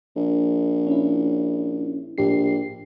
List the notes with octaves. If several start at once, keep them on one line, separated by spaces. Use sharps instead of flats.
A#1
C#4 E4
A#1 A2 G4 C7